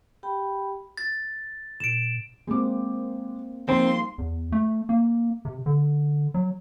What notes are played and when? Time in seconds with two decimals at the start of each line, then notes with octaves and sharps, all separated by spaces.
0.23 G4 G5 B5
0.97 A6
1.80 A#2 D7 E7
2.47 G#3 A#3 C4 D6
3.69 F3 G3 A#3 C4 D#4 C6
4.18 E2
4.52 A3
4.89 A#3
5.45 C3
5.66 D3
6.34 F#3